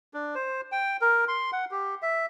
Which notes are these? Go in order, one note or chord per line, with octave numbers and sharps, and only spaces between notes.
D4
C5
G5
A#4
C6
F#5
G4
E5